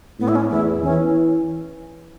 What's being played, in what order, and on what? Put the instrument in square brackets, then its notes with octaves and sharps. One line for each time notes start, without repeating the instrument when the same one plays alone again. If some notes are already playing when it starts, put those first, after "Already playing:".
[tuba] A2 [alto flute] B3
[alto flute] E4
C#4
[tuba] E2 [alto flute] E4
[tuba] E3 [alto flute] C#4